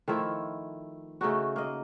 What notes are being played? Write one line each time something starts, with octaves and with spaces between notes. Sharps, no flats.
D#3 F3 A3 E4
C#3 A3 D#4 F#4
A#3 D#5